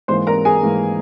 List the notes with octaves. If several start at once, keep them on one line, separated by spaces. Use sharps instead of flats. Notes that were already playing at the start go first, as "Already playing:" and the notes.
G#2 E3 A#3 C5 C6
A#4 A#5
G#4 G#5
G#2 E3 A#3